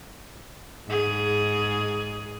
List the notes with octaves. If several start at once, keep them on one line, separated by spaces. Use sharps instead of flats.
G#2 G#4